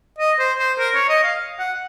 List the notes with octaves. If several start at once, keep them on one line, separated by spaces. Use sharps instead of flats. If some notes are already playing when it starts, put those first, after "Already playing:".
D#5
C5
C5
A#4
C#5
D#5
F5
F#5